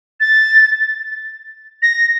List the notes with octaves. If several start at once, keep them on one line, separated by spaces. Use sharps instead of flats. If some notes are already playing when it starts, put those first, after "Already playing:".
A6
A#6